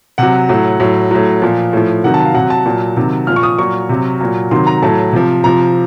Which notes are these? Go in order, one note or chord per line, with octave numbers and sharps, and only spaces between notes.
C3 F#3 F#5
A2 F#3
A2 F#3
A2 F#3
A#2 F3
A2 F3
C3 D#3 F#3 F#5
A5
F5
C3 F#3 F#5
A5
A#2 F#3
C3 D#3 F#3
A#2 F3 F6
C#6
D#6
A#2 F#3 C#6
C3 F#3
A#2 F#3
C3 D#3 F#3 C6
A#5
A2 F#3 A5
C3 F3
C3 F3 A#5